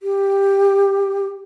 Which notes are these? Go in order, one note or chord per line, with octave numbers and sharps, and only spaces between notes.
G4